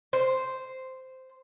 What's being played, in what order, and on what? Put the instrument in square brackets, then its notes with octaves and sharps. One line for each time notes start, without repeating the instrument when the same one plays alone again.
[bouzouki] C5